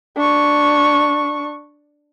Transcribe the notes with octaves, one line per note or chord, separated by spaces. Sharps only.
D4 C#6